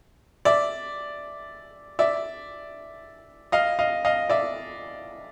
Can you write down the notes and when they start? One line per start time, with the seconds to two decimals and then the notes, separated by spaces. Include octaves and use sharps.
0.45 D5 E5
1.99 D5 E5
3.52 D#5 F5
3.79 D#5 F5
4.05 D#5 F5
4.29 D5 E5